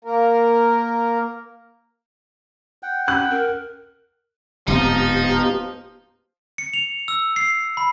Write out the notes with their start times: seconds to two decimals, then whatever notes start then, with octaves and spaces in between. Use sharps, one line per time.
0.05 A#3 A#4
2.83 F#5 G5
3.08 C#4 F#6
3.30 A#4
4.68 D1 G#2 F3 B3 C4 D#4 G4
6.58 C#7
6.73 F7
7.08 E6
7.36 C7
7.77 B5